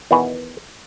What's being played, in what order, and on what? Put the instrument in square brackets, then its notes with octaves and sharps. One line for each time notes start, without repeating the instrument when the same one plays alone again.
[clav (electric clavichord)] E2 B2 D#3 F#4 B4 G#5